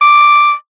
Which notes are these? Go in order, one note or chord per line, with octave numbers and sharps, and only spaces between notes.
D6